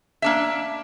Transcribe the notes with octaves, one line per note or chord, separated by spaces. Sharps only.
A#3 D4 E5